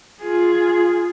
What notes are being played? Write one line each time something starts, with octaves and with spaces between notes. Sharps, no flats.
F4 G#4